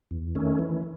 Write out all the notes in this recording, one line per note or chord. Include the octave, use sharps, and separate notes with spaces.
E2
D#3 A3 C#4
E3